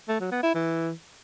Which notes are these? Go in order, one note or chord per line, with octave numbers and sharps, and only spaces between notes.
A3
F#3
B3
E4
E3